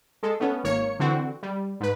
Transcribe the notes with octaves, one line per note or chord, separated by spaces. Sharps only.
G#3 A4
A3 B3 C#4
G#1 A#3 C#5 C#7
D3 E3 C4 F#4
G3
G#2 B4